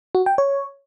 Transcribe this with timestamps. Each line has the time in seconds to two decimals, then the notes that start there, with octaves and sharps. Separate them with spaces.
0.15 F#4
0.26 G5
0.38 C#5